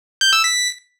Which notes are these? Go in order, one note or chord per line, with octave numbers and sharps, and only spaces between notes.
G6
E6
B6